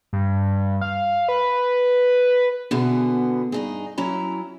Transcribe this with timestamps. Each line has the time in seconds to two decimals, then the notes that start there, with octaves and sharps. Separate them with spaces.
0.13 G2
0.81 F5
1.29 B4
2.71 B2 D3 B3 E4 G#4
3.52 G2 D#4 G#4
3.97 F#3 C#4 E4 A#5